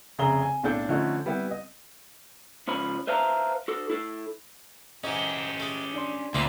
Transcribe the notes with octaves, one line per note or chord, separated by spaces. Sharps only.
F1 C#3 G#4 E5 A#5 G7
G#5
B1 A2 D4 A4 G6
D3 F3 A3 C#4 D#4
G3 B3 E4 G4
D#5
C#2 F3 C#4 B5
B4 C5 E5 F5 A5 A#5
F#4 A4
E4 A4
G#2 E3 C#4 G4 D#5
G#3 A3
D4 D5 C6
D2 A#2 A#3 C4 D4 E5 C6